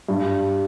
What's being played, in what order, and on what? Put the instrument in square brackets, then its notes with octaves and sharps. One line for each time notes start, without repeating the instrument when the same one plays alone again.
[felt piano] G2